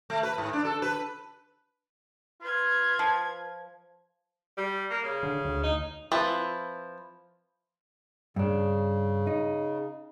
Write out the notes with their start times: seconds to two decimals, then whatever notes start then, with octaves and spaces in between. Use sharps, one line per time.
0.10 A3
0.23 B4
0.38 G#2
0.53 D4
0.65 A4
0.82 B4
2.41 F4 B4 G#6
2.99 F3
4.57 G3
4.91 A#3
5.03 C#3
5.23 D3
5.45 D2
5.63 D#4
6.12 F3 C4 E4 B4
8.36 G2 C#3 D4
9.27 D#4